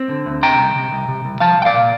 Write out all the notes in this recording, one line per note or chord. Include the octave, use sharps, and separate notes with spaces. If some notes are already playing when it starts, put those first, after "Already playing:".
Already playing: C4
D3
D2
C3 G5 A#5
C2
C3
C2
C3
C2
F3 F5 A5
C2 G5
D5 F5
A#2